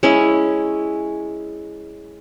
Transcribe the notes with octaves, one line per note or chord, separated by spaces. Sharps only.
G#3 C#4 E4